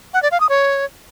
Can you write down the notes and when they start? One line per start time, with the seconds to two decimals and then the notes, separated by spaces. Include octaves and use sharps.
0.14 F#5
0.23 D5
0.31 F5
0.40 D#6
0.49 C#5